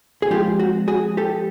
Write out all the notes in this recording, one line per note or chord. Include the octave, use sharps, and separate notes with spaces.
G#4
F3 G#3 C4 F4 G4
F#4
F#4 G#4
G4 A4